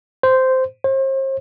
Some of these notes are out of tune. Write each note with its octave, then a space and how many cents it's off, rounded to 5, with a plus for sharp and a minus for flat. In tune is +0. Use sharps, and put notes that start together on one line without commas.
C5 -10
C5 +40